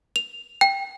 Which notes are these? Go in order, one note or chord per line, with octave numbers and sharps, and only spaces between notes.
F7
G5